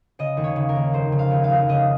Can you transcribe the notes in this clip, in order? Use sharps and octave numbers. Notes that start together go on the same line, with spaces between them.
C#3 D#5
D#2
C#5
C#3
A#4
D#2
F1 C5
C#3
F5
D#2
F5
F1
C#3 D#5